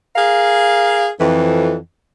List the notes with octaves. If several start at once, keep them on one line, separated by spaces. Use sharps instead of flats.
G#4 A#4 F5
F2 E3